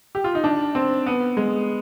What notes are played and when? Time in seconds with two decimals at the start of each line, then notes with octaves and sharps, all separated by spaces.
0.15 G4
0.24 F4
0.35 D#4
0.44 D4
0.75 C4
1.06 B3
1.37 G#3